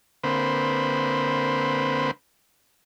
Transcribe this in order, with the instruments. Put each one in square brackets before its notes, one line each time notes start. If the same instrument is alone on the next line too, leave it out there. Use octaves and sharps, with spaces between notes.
[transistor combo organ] D3 A#3 C4 B4 C5 B5